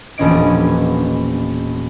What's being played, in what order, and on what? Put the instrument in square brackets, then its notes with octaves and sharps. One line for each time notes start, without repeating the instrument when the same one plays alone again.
[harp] E1 A#1 B3 C#4 D#5 D7